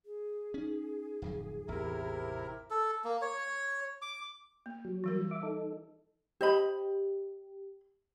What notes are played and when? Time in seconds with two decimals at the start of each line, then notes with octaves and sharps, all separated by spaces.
0.06 G#4
0.54 C#4 D#4
1.22 D1 F2 F3
1.68 A1 E2 C3 E4 A#4
2.70 A4
3.04 A#3
3.22 C#5
4.02 D6
4.66 A#3
4.85 F#3
5.04 E3 G3 A#4
5.31 E5 D6
5.43 D#4 A4
6.41 G4 C5 D#5 B5